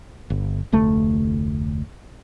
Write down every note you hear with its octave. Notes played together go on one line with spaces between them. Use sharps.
G1
F1 D2 A3